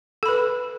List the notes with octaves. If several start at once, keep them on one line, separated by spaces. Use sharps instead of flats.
A4 B4 B5